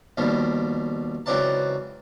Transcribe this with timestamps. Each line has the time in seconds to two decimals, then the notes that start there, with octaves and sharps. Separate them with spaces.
0.17 D#2 B2 F3 G3
1.26 C#2 E3 F#3 C4 D5 A5